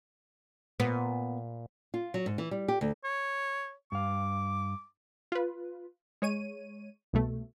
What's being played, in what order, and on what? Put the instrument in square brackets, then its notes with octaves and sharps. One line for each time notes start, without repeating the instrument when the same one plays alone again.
[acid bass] A#2 [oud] B3
[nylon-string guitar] F4
F#3
G#2
E3
G3
G4
D2
[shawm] C#5
[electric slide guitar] G2 F5 [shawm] D6
[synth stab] F4 B4
G#3 C#5 D#7
C2 B2 A3